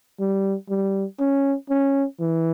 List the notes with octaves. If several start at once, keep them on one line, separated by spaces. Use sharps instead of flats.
G3
G3
C#4
C#4
E3